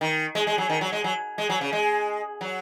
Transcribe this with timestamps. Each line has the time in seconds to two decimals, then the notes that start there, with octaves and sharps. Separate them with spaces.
0.01 D#3
0.35 G#3
0.47 G#3
0.58 F#3
0.70 D#3
0.81 F#3
0.92 G#3
1.04 F#3
1.38 G#3
1.49 F#3
1.61 C#3
1.73 G#3
2.41 F#3